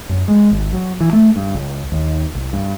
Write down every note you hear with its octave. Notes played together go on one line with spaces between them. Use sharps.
F#2
G#3
G#1
F#3
E3
A3
G2
C#2
D#2
C2
G2